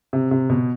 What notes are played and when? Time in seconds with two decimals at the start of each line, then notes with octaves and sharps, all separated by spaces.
0.13 C3
0.31 C3
0.50 B2